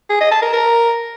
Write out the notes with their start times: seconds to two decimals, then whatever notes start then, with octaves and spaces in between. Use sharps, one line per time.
0.10 G#4
0.21 D#5
0.31 A5
0.42 A#4
0.53 A#4